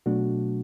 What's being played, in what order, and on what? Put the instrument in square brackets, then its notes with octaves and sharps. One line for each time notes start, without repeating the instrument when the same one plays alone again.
[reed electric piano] B2 F#3 A3 D4 F#4